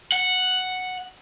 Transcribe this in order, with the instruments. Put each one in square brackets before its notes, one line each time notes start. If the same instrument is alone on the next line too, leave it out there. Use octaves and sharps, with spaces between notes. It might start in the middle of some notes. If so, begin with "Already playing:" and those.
[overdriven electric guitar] F#5